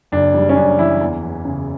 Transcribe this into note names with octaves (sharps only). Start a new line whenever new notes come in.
F#1 D4
G3
C#4
F#2 D4
E3 E4
E2
E2
C#3